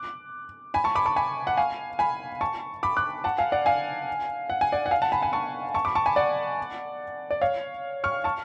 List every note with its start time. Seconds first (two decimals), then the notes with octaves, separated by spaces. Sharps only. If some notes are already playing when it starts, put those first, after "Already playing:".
Already playing: D6 F#6
0.74 G#5 B5
0.84 A5 C#6
0.95 B5 D6
1.06 A5 C#6
1.16 G#5 B5
1.47 F#5
1.57 F5 G#5
1.99 G#5 B5
2.41 A5 C#6
2.83 B5 D6
2.97 D6 F#6
3.24 F#5 A5
3.38 F5 G#5
3.52 D5 F#5
3.66 F5 G#5
4.50 F#5
4.61 G#5
4.72 D5 F#5
4.86 F#5
4.91 F5 G#5
5.02 F#5 A5
5.12 G#5 B5
5.22 G#5 B5
5.33 A5 C#6
5.74 A5 C#6
5.85 B5 D6
5.95 A5 C#6
6.06 G#5 B5
6.16 D5 F#5
7.31 D5
7.41 C#5 F5
8.04 C#6 F6
8.24 A5 C#6